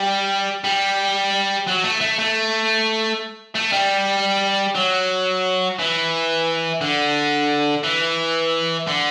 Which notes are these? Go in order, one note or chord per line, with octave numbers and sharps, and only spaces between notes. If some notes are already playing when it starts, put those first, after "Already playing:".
Already playing: G3
G3
F#3
A3
A3
A3
A3
G3
F#3
E3
D3
E3
D3